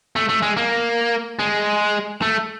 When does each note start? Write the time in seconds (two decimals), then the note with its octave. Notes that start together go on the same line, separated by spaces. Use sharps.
0.16 A3
0.29 A3
0.42 G#3
0.57 A#3
1.39 G#3
2.22 A3